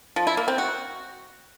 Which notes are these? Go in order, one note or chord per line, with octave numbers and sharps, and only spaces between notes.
F3
E4
A#3
C4
F#4